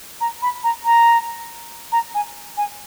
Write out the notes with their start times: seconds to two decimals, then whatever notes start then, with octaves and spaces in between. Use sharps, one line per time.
0.21 A#5
0.42 B5
0.64 A#5
0.85 A#5
1.92 A#5
2.15 G#5
2.57 G#5